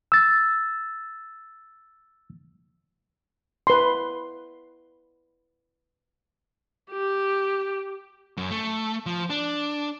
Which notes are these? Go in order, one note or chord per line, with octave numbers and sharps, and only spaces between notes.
E6 A6
B4 C6
G4
F#2
A3
F3
D4